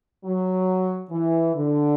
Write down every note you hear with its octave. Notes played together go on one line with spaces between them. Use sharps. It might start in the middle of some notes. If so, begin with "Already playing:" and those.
F#3
E3
D3